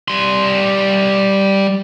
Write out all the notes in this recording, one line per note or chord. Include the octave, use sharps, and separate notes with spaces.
G3 C6